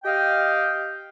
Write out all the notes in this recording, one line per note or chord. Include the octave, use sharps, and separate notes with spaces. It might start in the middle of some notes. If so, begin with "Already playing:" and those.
G4 D#5 F5 G5